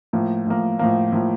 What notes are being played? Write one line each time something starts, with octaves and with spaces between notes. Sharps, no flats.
A2 F3 A#3
A2 F3 A#3
A2 F3 A#3
A2 F3 A#3